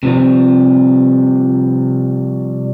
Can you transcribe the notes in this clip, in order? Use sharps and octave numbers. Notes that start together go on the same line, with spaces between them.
C3 F3 G3